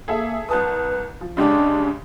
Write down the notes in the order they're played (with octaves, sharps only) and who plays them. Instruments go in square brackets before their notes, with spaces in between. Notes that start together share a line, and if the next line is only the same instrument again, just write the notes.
[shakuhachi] A#3 [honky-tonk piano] G#4 A4 E5
[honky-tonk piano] C2 A5 D#6 [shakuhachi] B4
[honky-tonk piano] F3
[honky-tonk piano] C#3 G#3 G4 [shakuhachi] D4